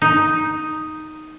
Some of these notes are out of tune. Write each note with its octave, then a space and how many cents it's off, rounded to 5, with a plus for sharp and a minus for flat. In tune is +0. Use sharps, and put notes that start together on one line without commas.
D#4 +0